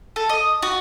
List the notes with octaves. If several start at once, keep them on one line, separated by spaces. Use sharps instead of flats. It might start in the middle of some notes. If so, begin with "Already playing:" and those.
A4
D#5
F#4